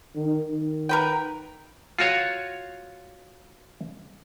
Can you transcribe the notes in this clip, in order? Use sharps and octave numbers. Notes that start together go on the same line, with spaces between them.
D#3
D#3
A#4 B4 G5
F4 F#4 C#5